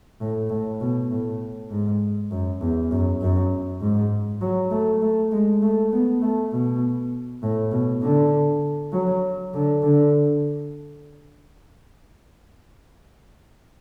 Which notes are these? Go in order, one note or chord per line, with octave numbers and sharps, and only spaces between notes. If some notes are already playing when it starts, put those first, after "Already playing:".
A2
A2
B2
A2
G#2
F#2
E2
F#2
F#2
G#2
F#3
A3
A3
G#3
A3
B3
A3
B2
A2
B2
D3
F#3
D3
D3